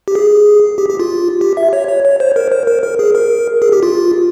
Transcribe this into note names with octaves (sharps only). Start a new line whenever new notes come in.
G4
G#4
G4
G4
F4
G4
E5
C#5
C#5
C#5
C5
A#4
C5
A#4
A#4
G#4
A#4
G#4
G4
F4